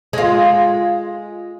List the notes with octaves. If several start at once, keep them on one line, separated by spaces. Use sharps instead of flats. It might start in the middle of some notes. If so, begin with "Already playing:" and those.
G#3 F4